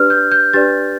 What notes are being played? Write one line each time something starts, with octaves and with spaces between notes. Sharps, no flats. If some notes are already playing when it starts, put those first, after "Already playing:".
Already playing: D4 G4 B4 D5 F6
G6
G6
D4 G4 B4 D5 A6